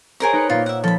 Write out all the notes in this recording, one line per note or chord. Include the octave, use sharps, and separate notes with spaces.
G#4 A#4 C5 C#5 G5 A#5
D#4 B4 C#7
A#2 A#3 F4
E5 F#5
F3 A4 B5